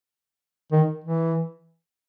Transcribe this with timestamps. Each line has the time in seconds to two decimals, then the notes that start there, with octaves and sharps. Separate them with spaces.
0.72 D#3
1.04 E3